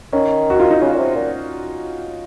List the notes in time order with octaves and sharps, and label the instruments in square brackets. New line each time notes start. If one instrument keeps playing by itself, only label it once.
[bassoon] D#3 [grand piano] C#4
[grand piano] F#4
F4
D#4
[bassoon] C#3 [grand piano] C#4
[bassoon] A#2
C3
A#2